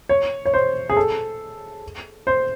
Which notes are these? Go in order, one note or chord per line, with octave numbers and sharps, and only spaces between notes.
C#5
C#5
C5
G#4
A4
C5